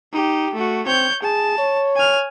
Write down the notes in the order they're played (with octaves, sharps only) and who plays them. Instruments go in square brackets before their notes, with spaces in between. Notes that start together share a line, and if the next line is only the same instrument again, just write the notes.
[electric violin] D#4 G4
A3 F#4
[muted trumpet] C4 [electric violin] C#5 G6
[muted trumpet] G#4 [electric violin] A5
[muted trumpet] C#5
[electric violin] G#5 F6